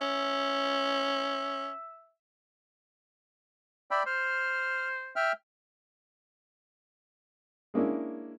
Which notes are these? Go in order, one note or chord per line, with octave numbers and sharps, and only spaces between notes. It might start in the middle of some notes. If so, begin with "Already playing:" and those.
C#4 E5
D5 E5 G5 B5
C5 F6
E5 G5 F6
G#3 A#3 C#4 D4 E4